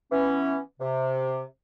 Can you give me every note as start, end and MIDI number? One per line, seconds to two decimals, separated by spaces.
0.12 0.57 52
0.12 0.57 59
0.12 0.57 61
0.80 1.41 48